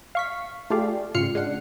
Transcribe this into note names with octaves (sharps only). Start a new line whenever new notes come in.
F5 C#6 B6
A3 F4 G4 G#4 D5 F5
G#1 C#3 F4 F6 C7 C#7
G#3 D4 F#5